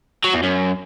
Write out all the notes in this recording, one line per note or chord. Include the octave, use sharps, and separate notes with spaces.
F#3
E2
F#2